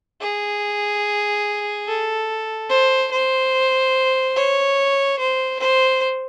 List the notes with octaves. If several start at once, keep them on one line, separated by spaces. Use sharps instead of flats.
G#4
A4
C5
C5
C#5
C5
C5